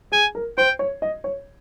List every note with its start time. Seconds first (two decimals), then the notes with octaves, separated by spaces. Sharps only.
0.12 G#4 G#5
0.35 A#4
0.58 C5 G5
0.79 C#5
1.02 D#5
1.24 C#5